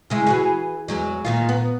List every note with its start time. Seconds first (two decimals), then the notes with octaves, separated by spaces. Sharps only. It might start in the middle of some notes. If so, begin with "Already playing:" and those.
0.10 C#3 G#3 E4
0.27 E3 F#4 G#4
0.88 E2 F#3 G#3
1.25 A#2 D#3 F4
1.49 B3